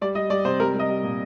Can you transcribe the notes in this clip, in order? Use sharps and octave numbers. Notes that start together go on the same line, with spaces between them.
G3 D5
G3 D#5
G3 D5
C3 C5
G3 A#4
G3
D#5
G3
A#2